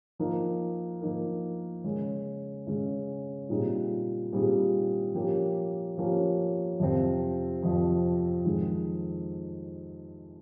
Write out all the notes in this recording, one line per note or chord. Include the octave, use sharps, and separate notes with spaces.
F3 A#3 D#4 A#4
F3 A#3 D#4 A#4
C#3 G#3 C#4
C#3 G#3 C#4
A#2 G3 C4 D#4 G#4
A#2 G3 C4 D#4 G#4
F3 A#3 C#4 G4 A#4
F3 A#3 C#4 G4 A#4
F2 C3 F3 C4
F2 C3 F3 C4
F2 D#3 G#3